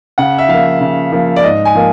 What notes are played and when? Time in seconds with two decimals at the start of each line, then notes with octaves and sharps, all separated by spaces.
0.18 C#3 F#5
0.38 E5
0.48 F3 A#3 F5
0.81 C#3
1.12 F3 A#3
1.36 D5
1.43 G#2 D#5
1.65 G#5
1.75 F3 A#3